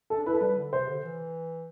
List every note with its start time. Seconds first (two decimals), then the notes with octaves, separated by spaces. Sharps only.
0.10 A4
0.17 D4
0.26 E4 B4
0.33 A4
0.41 G3 B4
0.57 D3
0.73 C3 C5
0.88 D3
1.03 E3